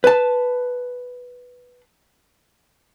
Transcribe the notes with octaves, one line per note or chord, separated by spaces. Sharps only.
B4 A5